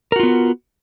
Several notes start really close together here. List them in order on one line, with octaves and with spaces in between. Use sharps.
A#4 F#4 F4 B3